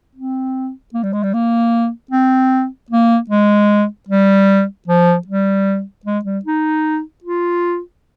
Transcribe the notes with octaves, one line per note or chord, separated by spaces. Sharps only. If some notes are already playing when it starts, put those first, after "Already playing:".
C4
A#3
G3
G#3
G3
A#3
C4
A#3
G#3
G3
F3
G3
G#3
G3
D#4
F4